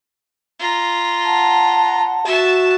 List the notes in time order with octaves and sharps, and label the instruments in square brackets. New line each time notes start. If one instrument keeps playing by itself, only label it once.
[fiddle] F4 A#5
[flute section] F#5 A5
[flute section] F#4 [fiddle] E5 A5